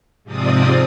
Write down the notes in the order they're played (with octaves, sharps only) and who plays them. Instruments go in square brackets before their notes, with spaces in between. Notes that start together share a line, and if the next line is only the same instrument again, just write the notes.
[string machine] G#2 C3 F3 C4 D5 D#6